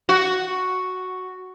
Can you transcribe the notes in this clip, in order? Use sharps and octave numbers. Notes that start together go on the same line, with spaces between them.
F#4